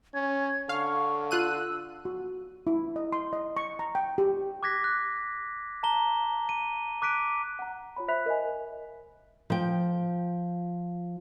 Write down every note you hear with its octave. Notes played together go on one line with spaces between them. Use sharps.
C#4 G#6
D3 F5 C#6
F4 E6 F#6 D#7
F#4
E4
D#5
C6
D#5
C#6
A#5
G5
G4
D6 F#6 G#6 A#6 B6
F#6
A5 A#5 G7
D#7
D6 F#6 B6 D7 D#7
F#5 A#5
F4 C#5 B5
C5 E5 B5 F#6 B6 F7
A#4 D#5 E5 G#5
F3 G5